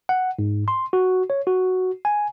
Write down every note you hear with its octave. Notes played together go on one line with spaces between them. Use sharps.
F#5
G#2
C6
F#4
C#5
F#4
G#5